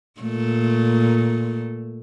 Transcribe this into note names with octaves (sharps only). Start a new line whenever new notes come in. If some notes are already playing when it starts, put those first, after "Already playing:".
A#2 A3